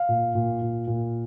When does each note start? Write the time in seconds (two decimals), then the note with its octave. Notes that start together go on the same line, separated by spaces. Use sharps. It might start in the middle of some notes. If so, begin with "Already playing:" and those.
Already playing: F5
0.09 A#2
0.35 A#2
0.62 A#2
0.87 A#2